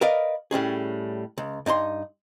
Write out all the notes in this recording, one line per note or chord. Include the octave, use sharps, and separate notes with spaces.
A#4 B4 D5 D#5 F5
A2 G3 C#4 G#4
C#2
G2 D#4 A#5 C6